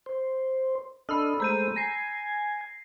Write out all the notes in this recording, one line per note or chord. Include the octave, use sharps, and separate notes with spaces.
C5
D4 A4 D#5 B5 E6 F6
G#3 A3 C5 A#5 G6 D#7
G#5 A#6 C7